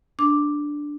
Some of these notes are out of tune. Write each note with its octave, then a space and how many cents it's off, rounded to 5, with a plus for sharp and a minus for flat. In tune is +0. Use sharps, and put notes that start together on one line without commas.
D4 +0 D6 +0